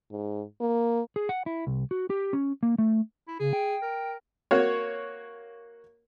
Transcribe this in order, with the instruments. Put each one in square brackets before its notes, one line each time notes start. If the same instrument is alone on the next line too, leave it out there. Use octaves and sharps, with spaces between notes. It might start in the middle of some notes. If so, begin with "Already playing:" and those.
[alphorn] G#2
A#3
[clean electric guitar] G#4
F#5
E4
C2
F#4
G4
C#4
A#3
A3
[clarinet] E4
[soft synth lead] C#3 [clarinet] G#4
[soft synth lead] G5
[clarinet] A#4
[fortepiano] A#3 F#4 C#5